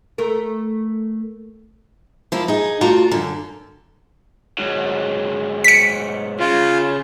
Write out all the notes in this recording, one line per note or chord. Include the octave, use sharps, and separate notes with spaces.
A3 A#4
F3 A#3 E4
D#4 G#4
A3 F4 F#4 D5 A#5
F#2 D3
G#2 F#3
B6 C#7
C#3 F4